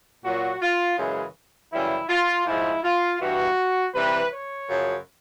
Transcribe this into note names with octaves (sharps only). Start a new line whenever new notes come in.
A#2 F#3 F#4
F4
F#2 C#3 E3 G#3
F#2 C#3 E3 G3 E4
F4
G#2 F3 G#3 E4
F4
G2 E3 G3 F#4
C3 E3 G3 B4
C#5
F#2 C#3 F3